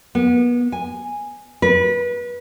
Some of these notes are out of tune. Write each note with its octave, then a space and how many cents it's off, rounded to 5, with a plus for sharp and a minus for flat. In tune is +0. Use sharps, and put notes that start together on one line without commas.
B3 -30
G#5 -5
B4 -30